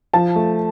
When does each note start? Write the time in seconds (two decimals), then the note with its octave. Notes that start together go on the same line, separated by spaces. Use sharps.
0.14 F3 A5
0.36 A3